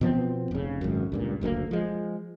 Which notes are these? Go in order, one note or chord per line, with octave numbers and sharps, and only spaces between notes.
B2 F3 B3 C4
F1 C#3
G#1 C#2 F#2
C#2 G2 A#2
F#1 D2 A2 A#3
F3 G#3